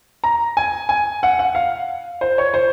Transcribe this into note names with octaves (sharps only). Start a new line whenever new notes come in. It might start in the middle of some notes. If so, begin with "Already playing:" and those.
A#5
G#5
G#5
F#5
F#5
F5
C5
C#5
C5